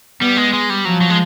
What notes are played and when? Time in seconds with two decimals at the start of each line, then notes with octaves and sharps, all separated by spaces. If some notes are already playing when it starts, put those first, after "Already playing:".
0.21 G3 B3
0.37 G#3
0.53 G#3
0.70 G3
0.85 F3 F#3
1.01 F#3
1.10 G#3